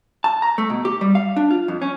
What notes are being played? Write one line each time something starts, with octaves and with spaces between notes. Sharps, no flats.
A5
A#5
A3
B2
G4
G3
F5
D4
F4
F2
C#4